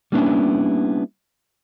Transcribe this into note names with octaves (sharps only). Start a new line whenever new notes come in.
G3 A#3 B3 C#4 D4 E4